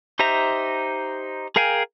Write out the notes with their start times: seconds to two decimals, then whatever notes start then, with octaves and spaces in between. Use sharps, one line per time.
0.19 D#4 G4 C5 E5 A#5
1.56 G#4 A#4 F5 G5 G#5